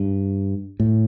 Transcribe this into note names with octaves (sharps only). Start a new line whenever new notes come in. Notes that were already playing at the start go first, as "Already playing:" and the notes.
Already playing: G2
A2